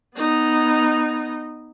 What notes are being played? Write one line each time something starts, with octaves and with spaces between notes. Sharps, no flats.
B3 D#4